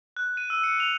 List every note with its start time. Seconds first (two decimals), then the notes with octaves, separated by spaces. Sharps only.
0.17 F#6
0.37 D#7
0.50 E6
0.64 C#7
0.80 F7